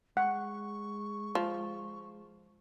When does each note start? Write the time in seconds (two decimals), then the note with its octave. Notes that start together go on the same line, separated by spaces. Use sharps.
0.17 G#3 F#5 C#6
1.35 F3